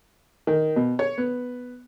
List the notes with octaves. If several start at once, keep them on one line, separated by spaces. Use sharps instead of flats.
D#3
B2
C#5
B3